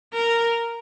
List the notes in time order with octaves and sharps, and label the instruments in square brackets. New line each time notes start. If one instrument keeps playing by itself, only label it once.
[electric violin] A#4